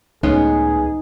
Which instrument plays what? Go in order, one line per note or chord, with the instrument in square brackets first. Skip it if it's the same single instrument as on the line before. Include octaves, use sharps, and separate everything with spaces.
[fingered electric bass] C#2 A2 [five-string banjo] G#3 B3 C#4 [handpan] D#4 [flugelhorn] G#4